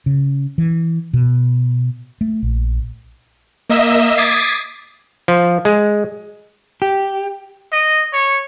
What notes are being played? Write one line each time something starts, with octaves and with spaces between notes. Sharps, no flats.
C#3
E3
B2
A3
A#1
A#3 D#5 E5 E7
D6 D#6 G#6 A6 B6 C7
F3
G#3
G4
D#5
C#5